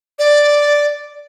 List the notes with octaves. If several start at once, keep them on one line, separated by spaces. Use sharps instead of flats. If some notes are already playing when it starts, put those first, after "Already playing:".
D5